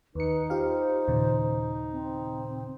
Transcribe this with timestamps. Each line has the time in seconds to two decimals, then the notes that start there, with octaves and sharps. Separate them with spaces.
0.15 D#2 D#4 B4 C#7
0.50 F4 G4 C5 F5
1.08 D#2 A#2 C#3
1.92 C4